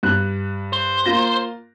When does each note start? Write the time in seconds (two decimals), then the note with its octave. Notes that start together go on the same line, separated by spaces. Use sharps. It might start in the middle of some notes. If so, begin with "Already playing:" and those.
0.03 G2 F#6
0.73 C5
1.06 A#3 F4 A#6